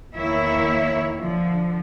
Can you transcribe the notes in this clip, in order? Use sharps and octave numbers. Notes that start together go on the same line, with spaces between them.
E2 D#3 A#3 E4 C#5 E5
D3 F3